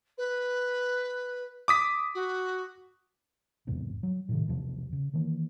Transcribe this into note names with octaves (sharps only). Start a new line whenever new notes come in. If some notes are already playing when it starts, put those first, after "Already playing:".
B4
D6 D#6 B6
F#4
B1 E2 G#2 C3
F#3
A2 C3 D#3
B1 E2 C3 F3
C#3
D#3 E3 A#3